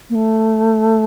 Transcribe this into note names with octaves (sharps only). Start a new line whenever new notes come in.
A#3
A3